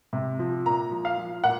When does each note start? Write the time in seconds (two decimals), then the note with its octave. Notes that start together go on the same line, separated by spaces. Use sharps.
0.13 C3
0.39 F3
0.66 A#2 A#5
0.91 F3
1.05 F5
1.18 F3
1.44 A#2 F#5